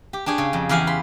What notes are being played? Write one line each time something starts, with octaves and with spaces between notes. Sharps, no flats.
G4
D4 G4 G#4 C#5
C#3
F2
E2 G4 F5 F#5 G#5
B5 C6